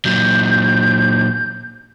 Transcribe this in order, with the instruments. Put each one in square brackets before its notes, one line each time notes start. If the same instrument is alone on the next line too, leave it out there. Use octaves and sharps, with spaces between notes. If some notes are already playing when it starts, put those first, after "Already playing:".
[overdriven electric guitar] A#2 F#3 [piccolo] G6